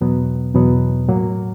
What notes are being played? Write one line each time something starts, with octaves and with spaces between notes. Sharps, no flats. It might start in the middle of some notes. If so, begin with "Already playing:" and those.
E2 B2 F#3 B3
E2 B2 F#3 B3
A2 F#3 A#3